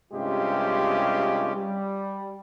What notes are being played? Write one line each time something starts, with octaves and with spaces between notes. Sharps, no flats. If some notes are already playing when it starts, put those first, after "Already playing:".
G2 C3 G#3 C#4 F4 G4
G3